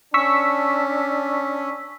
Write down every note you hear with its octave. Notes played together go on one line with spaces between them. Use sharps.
C#4 D4 C#6 E6 B6